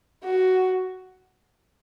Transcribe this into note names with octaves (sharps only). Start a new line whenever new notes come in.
F#4